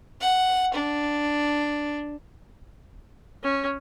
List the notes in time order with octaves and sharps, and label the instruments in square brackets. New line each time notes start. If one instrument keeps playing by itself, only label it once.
[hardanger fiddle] F#5
D4
[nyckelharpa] C#4